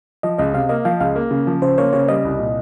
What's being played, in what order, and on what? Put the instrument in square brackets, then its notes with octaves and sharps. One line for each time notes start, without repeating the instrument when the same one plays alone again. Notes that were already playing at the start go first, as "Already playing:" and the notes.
[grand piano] F3 [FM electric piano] D#5
[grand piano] C#2 [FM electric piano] D#5
[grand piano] C3 [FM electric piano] F5
[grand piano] A#3 [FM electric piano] D#5
[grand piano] F3 [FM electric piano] F5
[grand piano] C#2 [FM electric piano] F5
[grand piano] A#3
C#3
F3
[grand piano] C#3 [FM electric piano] C5
[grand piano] A#3 [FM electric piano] C#5
[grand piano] C#3 [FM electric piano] C#5
[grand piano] G3 [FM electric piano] D#5
[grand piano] C2
A#2